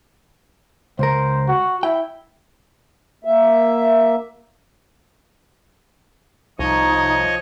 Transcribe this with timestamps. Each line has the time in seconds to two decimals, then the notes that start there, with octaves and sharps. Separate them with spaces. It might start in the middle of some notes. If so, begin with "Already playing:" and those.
0.99 C#2 A#4 C5
1.48 F#4
1.83 E4 G5
3.25 A#3 E5
6.59 C2 F3 D#4 C#5 D#5